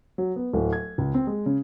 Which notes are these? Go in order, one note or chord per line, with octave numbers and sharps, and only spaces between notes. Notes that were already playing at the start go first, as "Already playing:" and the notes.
F#3
B3
D1
G#6
C#2
C4
G#3
C#3